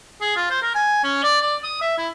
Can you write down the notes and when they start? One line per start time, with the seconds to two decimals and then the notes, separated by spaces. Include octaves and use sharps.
0.21 G#4
0.37 F4
0.51 C5
0.63 A#4
0.75 G#5
1.04 C#4
1.23 D5
1.42 D5
1.64 D#6
1.82 E5
1.98 E4